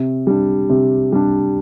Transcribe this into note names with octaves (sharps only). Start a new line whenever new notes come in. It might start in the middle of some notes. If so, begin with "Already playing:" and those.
Already playing: C3
G3 D4
C3
G3 D4